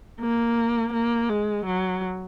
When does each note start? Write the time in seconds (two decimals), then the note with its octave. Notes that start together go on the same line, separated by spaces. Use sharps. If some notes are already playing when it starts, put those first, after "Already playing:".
0.21 A#3
0.93 A#3
1.30 G#3
1.65 F#3